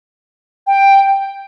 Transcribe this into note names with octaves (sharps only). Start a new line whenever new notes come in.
G5